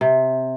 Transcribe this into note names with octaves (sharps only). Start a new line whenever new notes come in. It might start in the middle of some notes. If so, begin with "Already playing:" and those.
C3